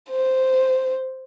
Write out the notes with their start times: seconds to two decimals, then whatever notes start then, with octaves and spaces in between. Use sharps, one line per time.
0.10 C5